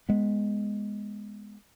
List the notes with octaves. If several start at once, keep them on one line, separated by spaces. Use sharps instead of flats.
G#3 B3